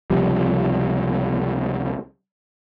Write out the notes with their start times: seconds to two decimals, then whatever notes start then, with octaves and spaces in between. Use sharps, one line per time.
0.10 C#2 C3 F3 G3